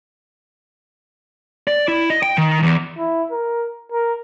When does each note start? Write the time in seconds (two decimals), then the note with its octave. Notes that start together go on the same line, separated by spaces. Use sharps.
1.67 D5
1.88 E4
2.10 D#5
2.23 G5
2.38 D#3
2.63 E2
2.98 E4
3.31 A#4
3.92 A#4